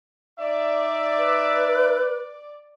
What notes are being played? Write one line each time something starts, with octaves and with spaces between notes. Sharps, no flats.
D#4 D5 E5
B4